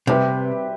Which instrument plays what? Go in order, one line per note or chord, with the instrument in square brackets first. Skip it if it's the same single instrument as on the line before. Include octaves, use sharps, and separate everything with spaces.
[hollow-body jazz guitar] C3 [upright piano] G3 C4 G4 B4 E5